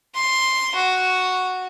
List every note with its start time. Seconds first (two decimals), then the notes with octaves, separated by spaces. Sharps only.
0.15 C6
0.75 F#4